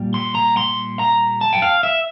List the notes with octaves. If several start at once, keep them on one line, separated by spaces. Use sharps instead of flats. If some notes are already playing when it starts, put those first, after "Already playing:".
Already playing: A#2 G3 A#3
C6
A#5
C6
A#5
A5
G5
F5
E5